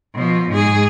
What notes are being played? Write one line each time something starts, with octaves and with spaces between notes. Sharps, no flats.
B2 F3
G#2 G#4